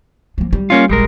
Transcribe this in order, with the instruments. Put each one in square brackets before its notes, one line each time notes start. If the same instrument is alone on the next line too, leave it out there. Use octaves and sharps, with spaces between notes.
[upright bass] F3 A#3
G3
[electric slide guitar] A#3 C#4 F4
[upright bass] F1 A#1 [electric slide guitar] G3 G#3 A#4